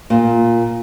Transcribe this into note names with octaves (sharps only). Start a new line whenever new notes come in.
A#2